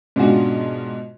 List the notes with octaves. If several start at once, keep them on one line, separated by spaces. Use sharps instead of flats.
G#2 B2 C#4 D4 F4 F#4